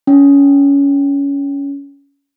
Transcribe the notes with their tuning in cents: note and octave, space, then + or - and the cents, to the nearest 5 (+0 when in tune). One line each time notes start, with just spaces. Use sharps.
C#4 +20